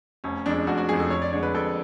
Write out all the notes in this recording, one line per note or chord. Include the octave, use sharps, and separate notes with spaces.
F1 C#4
F2 F3 G#3 D4
F1 F#4
F#4
F2 F3 G#3 G#4
A4
F2 C#5
D5
D3 G#3 C#5
B4
F2 A4